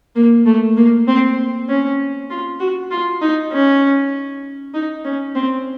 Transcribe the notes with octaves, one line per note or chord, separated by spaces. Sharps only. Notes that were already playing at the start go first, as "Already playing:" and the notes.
A#3
A3
A#3
C4
C#4
F4
F#4
F4
D#4
C#4
D#4
C#4
C4